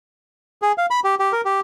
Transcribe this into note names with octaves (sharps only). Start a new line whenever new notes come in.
G#4
F5
B5
G4
G4
A#4
G4